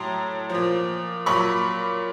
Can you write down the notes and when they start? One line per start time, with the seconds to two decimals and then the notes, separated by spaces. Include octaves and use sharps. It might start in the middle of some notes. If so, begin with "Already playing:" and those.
Already playing: A2 F#3 A#5 C6
0.50 F3
0.55 A#2
1.26 A#2 F#3 B5 C#6